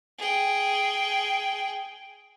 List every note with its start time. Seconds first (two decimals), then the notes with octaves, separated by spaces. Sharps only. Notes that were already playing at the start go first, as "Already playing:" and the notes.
0.18 G#4 G5